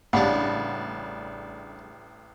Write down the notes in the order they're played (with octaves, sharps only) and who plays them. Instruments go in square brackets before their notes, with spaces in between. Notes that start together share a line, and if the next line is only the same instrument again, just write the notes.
[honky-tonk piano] A1 [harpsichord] C#3 G3 D4 [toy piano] F5 F#5 B5